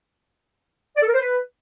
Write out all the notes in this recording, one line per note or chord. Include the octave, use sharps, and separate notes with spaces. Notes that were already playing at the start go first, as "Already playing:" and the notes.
D5
A4
A#4
C5
B4